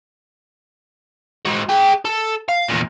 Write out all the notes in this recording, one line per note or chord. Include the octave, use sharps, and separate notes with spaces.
G#3 F#4
G#4 G5
A4
F5
E2 A#2